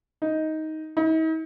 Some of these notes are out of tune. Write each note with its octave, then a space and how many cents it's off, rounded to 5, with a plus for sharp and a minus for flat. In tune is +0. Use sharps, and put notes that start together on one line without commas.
D#4 +10
D#4 +45